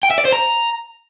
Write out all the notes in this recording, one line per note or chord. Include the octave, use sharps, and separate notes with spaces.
G5
E5
D5
C5
A#5